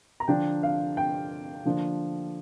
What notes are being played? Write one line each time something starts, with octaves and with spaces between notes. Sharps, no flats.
A#5
D3 F3 D4 G5
F5
G5
D3 F3 A#3 D4